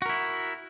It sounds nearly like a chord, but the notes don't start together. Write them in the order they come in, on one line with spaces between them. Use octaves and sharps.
F#4 A#4 E4